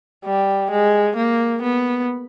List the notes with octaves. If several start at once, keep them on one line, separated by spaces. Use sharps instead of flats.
G3
G#3
A#3
B3